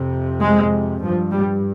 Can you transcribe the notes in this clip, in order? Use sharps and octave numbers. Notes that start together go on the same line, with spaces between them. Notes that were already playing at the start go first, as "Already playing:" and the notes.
Already playing: F2 C3
G#3
G2 F3
G3